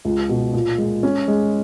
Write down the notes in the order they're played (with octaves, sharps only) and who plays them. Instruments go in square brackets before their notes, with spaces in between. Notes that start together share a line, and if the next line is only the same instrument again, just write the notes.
[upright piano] C#2
B2
A#2
G#3
C#4
G#3